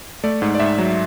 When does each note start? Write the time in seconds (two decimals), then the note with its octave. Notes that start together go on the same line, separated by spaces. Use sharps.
0.24 A3 D5
0.42 G#2
0.55 D5
0.60 G#2 E5
0.78 F#3